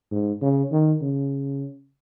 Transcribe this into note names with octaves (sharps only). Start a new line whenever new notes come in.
G#2
C#3
D#3
C#3